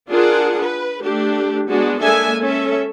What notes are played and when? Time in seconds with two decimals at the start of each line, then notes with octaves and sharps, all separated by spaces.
0.10 D4 F4 G#4 A#4 F#5
0.61 B4
1.01 A3 D4 G4
1.69 G#3 B3 D4 F#4
2.02 G#3 A#3 D4 A4 E5 G#5
2.41 C#4 A4 E5